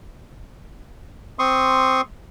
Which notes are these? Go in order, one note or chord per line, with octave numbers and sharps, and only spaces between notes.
C4 C6 C#6 D#6